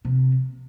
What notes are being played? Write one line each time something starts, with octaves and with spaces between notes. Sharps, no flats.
C3